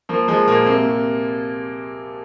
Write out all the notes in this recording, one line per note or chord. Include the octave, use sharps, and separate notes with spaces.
F3 A#3
F3 G#3
A#2 A#3
C3 A#3
C3